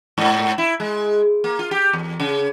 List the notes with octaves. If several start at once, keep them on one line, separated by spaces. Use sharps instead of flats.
G#2
E4
G#3
A#3
F4
G4
E2
C#3